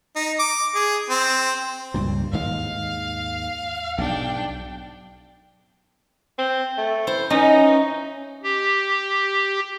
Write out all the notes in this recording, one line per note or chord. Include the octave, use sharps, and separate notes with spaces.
D#4
D6
G#4
C4
C#2 G2 A#2
D#2 G#2 G#3 F5
B1 G#2 D4 G5
C4
A3
E4 C5
C#4 D#4
G4